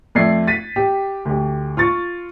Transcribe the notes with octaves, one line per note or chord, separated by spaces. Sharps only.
F2 A3 D5 G#6 C7
A6 B6 D#7
G4
D2 G4
F4 C#6 A6